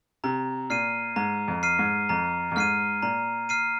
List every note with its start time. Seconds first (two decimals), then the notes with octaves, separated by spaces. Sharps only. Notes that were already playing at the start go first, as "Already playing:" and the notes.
0.24 C3 A#5
0.70 A#2 F6 C7 D#7
1.16 G#2 A#5
1.48 F2
1.63 F6 C7 D#7
1.79 G#2
2.09 F2 A#5
2.52 F2
2.56 G#2 F6 C7 D#7
3.02 A#2 A#5
3.49 F6 C7 D#7